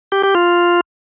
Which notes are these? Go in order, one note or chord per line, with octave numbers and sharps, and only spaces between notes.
G4
G4
F4